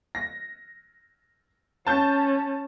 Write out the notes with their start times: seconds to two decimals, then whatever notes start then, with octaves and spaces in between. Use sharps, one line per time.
0.15 A#6
1.87 C#4 A5 G6